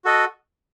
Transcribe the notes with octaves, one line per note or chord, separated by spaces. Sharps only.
F#4 A4 D#5